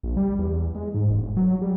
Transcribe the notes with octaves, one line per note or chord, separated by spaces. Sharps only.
A#1
G3
E2
G#3
G#2
E1
F#3
G3